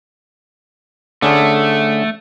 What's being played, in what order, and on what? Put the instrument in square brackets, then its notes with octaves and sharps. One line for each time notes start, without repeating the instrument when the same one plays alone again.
[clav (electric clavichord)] D3 C#4 G#4 [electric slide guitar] A3